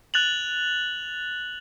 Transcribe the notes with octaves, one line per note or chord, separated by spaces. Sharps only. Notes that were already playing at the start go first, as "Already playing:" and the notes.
F#6 A6 F7 F#7